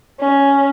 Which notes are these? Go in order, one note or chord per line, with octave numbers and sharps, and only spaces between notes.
C#4